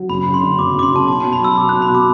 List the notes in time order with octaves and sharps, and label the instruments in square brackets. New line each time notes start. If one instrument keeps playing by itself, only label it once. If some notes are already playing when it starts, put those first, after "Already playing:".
Already playing: [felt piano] F#3
[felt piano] F#1 [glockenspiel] B5
[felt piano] F#2
[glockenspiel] C6
[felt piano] D3
[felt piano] F#1 [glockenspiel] D6
[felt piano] F#1 [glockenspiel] D6
[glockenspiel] C6
[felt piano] F#2 [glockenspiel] A5
[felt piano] B1 [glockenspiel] A5
[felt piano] B2 [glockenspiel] A5
[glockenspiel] B5
[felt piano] F#3 [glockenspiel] E6
[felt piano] B1 [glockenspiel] D6
[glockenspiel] F#6
[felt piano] B1
[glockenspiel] B5
[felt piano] B2
[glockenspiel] D6